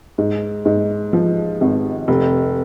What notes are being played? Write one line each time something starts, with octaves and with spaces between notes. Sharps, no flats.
G#2
G#2
F3
G#1
F1